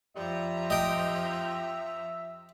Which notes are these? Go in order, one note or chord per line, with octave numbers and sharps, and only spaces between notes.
F2 F3 G3 E5 A#5
G4 D#5 G5